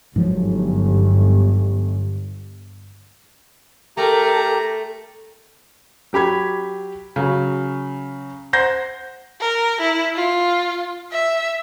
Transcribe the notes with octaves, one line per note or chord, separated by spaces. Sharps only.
G1 G#2 F3 F#3
A3 G4 A4 A#4 A#5
F#3 G4 B5 G#6
C#3 F#3
C5 F#5 G6 A#6
A#4
E4
F4
E5